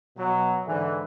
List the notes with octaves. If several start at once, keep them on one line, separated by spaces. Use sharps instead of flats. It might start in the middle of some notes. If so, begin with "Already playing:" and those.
B2 F#3
G#2 D3 E3